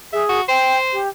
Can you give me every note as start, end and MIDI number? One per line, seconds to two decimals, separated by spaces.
0.13 0.41 68
0.13 0.24 76
0.29 0.42 66
0.49 0.98 72
0.49 0.77 79
0.93 1.08 67